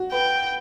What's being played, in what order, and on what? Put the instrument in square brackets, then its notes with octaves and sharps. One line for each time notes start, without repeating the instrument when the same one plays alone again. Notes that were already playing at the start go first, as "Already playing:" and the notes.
Already playing: [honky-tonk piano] F#4
[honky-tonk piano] B4 [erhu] G5